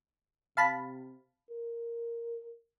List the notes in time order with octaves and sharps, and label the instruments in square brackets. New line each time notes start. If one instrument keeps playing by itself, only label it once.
[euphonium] C3 [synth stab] F5 A5 B5
[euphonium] A#4